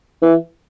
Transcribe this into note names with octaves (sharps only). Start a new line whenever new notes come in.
E3